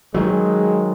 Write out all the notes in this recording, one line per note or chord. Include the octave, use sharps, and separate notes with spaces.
D#3 F#3 G#3